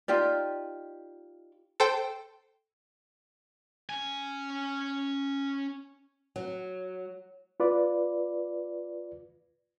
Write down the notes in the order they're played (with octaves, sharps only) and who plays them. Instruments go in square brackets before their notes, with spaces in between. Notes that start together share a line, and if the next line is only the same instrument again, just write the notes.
[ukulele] D#4 F4 G4 D5
[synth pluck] A4 C5 G5
[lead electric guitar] C#4 G#5
[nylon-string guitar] F#3
[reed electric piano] F4 B4 D5